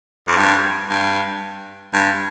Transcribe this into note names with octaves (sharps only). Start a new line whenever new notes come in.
F2
G2
G2
G2